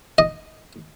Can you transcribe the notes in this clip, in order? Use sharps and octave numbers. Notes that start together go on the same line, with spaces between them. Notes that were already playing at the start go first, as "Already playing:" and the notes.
D#5